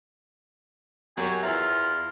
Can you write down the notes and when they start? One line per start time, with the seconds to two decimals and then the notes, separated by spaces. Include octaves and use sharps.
1.17 F#2 F#3 G4 C#5 G#5
1.43 E2 F4 E5 A#5 E6